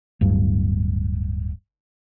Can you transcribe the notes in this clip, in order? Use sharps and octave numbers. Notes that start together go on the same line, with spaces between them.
D1 G2